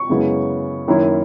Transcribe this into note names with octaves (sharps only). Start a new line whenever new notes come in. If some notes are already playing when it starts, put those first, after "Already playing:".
Already playing: C#6
F#2 C#3 G#3 B3 E4
F#2 D#3 A#3 E4